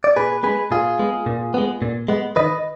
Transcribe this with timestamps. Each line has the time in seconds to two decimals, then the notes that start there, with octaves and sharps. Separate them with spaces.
0.04 D5
0.16 A#2 G#4 B4
0.43 G#3 B3 G#4 B4
0.71 A#2 F4 G#4
0.99 G#3 B3
1.26 A#2
1.54 G#3 B3
1.82 A#2
2.08 G#3 B3
2.36 D#3 B4 D#5